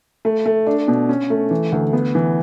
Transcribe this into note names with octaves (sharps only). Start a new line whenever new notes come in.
A3
A3
D4
B2
C#4
A3
E3
D2
B3
E3